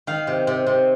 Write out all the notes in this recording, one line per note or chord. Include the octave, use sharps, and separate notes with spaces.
D#3 F5
C3
C3
C3